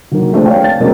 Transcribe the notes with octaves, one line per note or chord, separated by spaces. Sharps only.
D3 D#3 F#3 A#3
F3 G#3 A3 C4 D4
B4 C#5 D5 F5 G5 A5
A6
B2 F3 G#3 A#3 C4 C#4